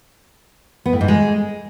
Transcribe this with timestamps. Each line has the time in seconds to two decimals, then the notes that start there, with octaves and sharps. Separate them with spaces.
0.86 B3
0.93 A2
1.01 G#2
1.08 G#3